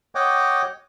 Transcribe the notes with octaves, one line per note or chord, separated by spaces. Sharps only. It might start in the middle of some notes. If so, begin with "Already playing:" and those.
C#5 D#5 F#5 G5 D6